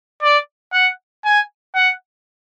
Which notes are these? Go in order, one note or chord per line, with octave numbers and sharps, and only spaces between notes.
D5
F#5
G#5
F#5